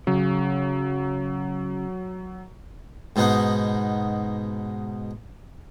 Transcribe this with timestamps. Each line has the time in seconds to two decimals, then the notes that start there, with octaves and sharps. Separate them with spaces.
0.07 C#3 F#3
3.16 G#2 B2 B3 D#4